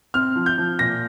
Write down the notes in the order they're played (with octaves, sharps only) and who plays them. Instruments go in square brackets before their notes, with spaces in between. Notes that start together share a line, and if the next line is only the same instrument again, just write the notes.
[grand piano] C4 F6
F3
G6
F3
A#2 A#6